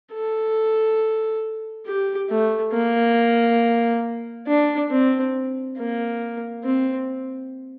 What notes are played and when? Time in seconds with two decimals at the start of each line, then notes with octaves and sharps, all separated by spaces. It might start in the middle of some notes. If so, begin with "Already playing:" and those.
0.13 A4
1.87 G4
2.30 A3
2.74 A#3
4.48 D4
4.90 C4
5.78 A#3
6.64 C4